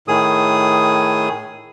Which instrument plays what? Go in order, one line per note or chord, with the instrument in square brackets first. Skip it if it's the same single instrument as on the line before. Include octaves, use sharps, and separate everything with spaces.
[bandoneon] A2 D#3 G#4 D#6